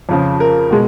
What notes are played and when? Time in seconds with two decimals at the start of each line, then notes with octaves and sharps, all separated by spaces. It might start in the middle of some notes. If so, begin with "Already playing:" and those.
0.09 F2 C#3 F3
0.40 A#4
0.71 B2 G#3